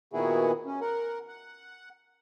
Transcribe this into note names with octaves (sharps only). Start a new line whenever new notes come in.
A#2 D#3 B3 E4 F#4 G#4
C#4
A#4 F#5
F#5